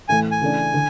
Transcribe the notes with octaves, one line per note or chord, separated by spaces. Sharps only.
A2 E3 A3 G#5
G#5
C#3 E3 A3 D4
D3